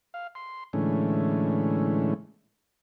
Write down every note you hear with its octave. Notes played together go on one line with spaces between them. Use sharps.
F5
C6
A2 D3 E3 G#3 A3 C#4